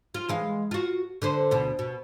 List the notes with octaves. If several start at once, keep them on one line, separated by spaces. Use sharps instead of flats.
F4
E3 G#3 F5
F4 F#4
D3 B4 C5
D2 B2
B2